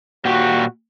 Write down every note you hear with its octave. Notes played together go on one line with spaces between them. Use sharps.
A#2 F#4 G4